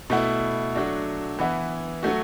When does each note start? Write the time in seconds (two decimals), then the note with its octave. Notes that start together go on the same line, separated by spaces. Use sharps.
0.10 B2 A3 E4
0.75 F#3 A3 D4 F#4
1.39 E3 B3 E4
2.03 F#3 A3 F#4